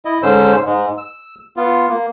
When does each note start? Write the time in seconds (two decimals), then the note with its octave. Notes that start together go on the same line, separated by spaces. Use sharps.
0.05 E4 D#5
0.23 G#2 D3 C#4 C5 E6
0.66 G#2 G#3
0.98 E6
1.57 B3 F4
1.89 A#3